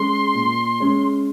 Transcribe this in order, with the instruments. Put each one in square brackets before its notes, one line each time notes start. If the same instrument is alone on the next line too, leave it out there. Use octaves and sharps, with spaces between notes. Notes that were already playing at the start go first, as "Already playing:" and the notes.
Already playing: [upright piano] G#3 C#4 [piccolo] C6
[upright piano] A#2
G#3 C#4